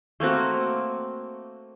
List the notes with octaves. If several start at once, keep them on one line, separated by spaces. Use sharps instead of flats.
A3 A#3 C4 F#4